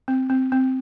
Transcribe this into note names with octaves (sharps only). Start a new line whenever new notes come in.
C4
C4
C4